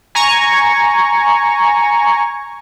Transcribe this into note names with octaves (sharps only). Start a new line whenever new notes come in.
G#5 A#5 C#6